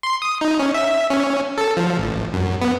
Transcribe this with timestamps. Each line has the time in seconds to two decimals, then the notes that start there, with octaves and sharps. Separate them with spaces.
0.03 C6
0.22 D#6
0.41 D#4
0.59 C#4
0.74 E5
1.10 C#4
1.58 A4
1.77 F3
1.99 A1
2.33 F#2
2.62 B3